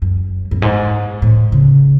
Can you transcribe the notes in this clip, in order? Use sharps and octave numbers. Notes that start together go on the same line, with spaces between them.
F#2
F#2
G#2
A2
C#3